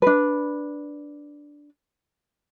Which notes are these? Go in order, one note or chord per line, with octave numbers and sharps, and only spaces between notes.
D4 B4